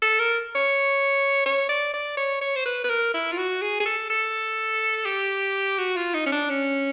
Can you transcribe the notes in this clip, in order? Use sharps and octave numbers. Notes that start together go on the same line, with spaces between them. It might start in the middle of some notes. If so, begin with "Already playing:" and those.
A4
A#4
C#5
C#5
D5
D5
C#5
C#5
C5
B4
B4
A#4
E4
F4
F#4
G#4
G#4
A4
A4
G4
F#4
F4
D#4
C#4
D4
C#4